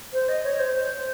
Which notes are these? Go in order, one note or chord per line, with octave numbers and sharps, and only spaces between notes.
C5
D#5
C#5
C5
C5